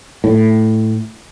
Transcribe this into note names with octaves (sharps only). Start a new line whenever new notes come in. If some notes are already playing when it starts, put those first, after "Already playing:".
A2